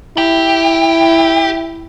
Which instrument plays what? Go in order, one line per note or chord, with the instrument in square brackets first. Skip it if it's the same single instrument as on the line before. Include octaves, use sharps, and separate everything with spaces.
[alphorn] E4 [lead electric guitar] G4